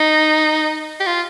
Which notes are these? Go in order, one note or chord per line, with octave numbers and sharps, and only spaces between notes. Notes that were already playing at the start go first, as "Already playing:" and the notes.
Already playing: D#4
G4
F4